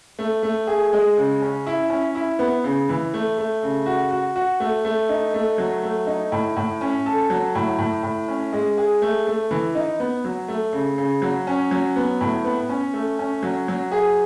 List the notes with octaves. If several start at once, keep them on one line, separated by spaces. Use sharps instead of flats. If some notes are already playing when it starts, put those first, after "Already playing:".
A3
A3
G#4
G#3
C#3
C#4
E4
C#4
E4
B3
C#3
E3
A3
A3
C#3
F#4
F#4
F#4
A3
A3
D#4
A3
F#3
A3
D#4
A2
A2
C#4
A4
F#3
A2
A2
A2
C#4
G#3
G#4
A3
A3
E3
D#4
B3
F#3
A3
C#3
C#3
F#3
C#4
F#3
B3
A2
B3
C#4
A3
C#4
F#3
F#3
G#4